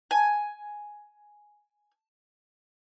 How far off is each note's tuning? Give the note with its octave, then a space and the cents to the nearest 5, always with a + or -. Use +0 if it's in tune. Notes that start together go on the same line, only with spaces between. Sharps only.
G#5 +5